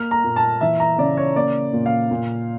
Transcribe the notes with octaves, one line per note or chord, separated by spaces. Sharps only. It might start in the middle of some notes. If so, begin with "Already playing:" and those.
Already playing: A#3 F6
A#5
A#2
A5
E3 E5
A#5
C#3 D5
C#5
A#3 D5
A#2
F5
A#2